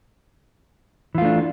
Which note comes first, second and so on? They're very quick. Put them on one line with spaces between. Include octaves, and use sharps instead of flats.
E3 F4 A3 D4